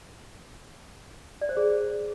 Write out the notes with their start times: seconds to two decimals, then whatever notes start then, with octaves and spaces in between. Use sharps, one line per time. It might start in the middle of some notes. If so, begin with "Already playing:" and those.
1.41 D5
1.49 C5
1.57 G#4